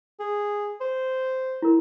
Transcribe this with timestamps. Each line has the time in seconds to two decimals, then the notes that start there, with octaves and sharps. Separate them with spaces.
0.20 G#4
0.81 C5
1.62 E4 A#4